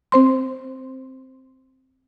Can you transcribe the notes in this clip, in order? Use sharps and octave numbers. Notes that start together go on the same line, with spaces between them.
C4 C5 C6